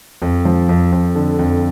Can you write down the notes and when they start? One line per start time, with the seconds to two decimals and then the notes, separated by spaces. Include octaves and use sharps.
0.22 F2
0.45 F3
0.69 F2
0.92 F2
1.15 D3
1.39 F2